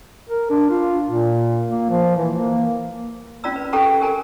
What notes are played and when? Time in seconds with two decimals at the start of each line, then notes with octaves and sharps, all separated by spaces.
0.29 A#4
0.50 D4
0.70 F4
1.08 A#2
1.69 A#3
1.90 F3
2.17 E3
2.35 A#3
3.44 C#4 F4 D5 A#5 E6
3.56 B4
3.73 C#4 G4 A4 G5 A#5 C#6
3.87 G4
4.01 G4 A#4 G#5 A#5